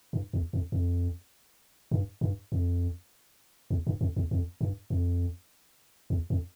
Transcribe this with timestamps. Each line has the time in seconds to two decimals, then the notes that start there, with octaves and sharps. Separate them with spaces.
0.13 G2
0.33 E2
0.53 F2
0.72 F2
1.91 G2
2.21 G2
2.52 F2
3.70 E2
3.87 G2
4.01 F2
4.16 E2
4.31 F2
4.61 G2
4.90 F2
6.10 E2
6.30 F2